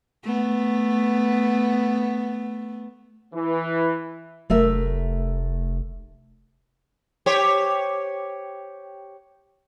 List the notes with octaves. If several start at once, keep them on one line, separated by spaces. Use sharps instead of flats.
A3 B3
E3
F1 A3 A#4 E5
G4 C5 C#5